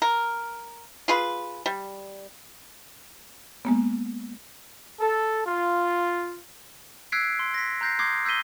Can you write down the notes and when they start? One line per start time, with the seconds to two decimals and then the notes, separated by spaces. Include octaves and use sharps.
0.02 A#4
1.08 F4 G#4 B4
1.66 G3
3.65 G#3 A#3 B3
4.99 A4
5.45 F4
7.12 E6 F#6 G#6 B6 C7 D7
7.39 C6
7.54 A#6 B6
7.81 A#5 F#6 G6 A#6 C7
7.99 C6 D6 D#6 G6 G#6 C7
8.25 E6 G6 A#6 B6 D#7 G7